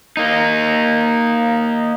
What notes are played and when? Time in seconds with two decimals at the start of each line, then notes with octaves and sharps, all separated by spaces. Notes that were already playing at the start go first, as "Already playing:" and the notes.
0.17 A#3 D#4